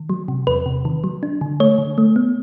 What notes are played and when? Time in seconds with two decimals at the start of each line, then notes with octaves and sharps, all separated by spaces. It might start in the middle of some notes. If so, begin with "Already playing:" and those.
Already playing: D#3
0.09 F#3
0.28 C3
0.47 E2 B4
0.66 C3
0.85 D#3
1.04 F#3
1.23 D4
1.41 D3
1.60 A3 C#5
1.78 D3
1.98 A3
2.16 B3